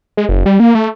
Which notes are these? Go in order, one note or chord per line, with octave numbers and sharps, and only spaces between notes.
G#3
F#1
G3
A#3
A3